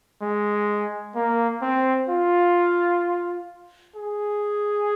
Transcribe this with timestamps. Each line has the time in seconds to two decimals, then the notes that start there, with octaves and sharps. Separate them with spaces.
0.21 G#3
1.15 A#3
1.62 C4
2.08 F4
3.96 G#4